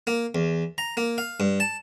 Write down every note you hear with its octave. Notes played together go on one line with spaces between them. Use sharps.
A#3
E2
A#5
A#3
F5
G2
A5